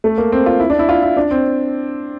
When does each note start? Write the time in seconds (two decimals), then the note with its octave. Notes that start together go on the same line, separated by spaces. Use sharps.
0.04 A3
0.18 A#3
0.32 C4
0.46 F4
0.60 E4
0.70 D4
0.79 E4
0.89 F4
1.03 E4
1.17 D4
1.31 C4